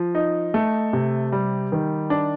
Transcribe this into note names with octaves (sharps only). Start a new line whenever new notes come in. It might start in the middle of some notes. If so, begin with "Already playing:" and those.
Already playing: F3
D#4
A3
C3
G3
D#3
D4